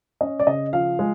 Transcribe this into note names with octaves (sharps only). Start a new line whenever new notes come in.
C#4 D#5
D5
C#3 D#5
F3 F5
G#3